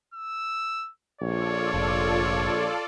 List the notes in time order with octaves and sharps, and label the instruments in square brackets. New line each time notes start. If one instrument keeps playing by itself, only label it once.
[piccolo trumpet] E6
[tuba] A#1 [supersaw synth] F4 A4 D5 [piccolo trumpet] C#5
[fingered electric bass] F1